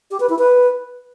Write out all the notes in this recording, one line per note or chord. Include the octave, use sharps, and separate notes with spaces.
G4
B4
E4
B4